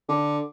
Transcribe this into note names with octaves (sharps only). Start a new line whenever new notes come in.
D3